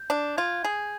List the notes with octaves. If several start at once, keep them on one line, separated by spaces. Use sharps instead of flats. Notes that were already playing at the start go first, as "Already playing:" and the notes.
Already playing: G6
D4
F4 G#6
G#4